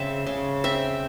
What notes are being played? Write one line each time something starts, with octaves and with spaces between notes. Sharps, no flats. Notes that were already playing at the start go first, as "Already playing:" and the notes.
Already playing: C#3 C4 E5
C#3
C4 E5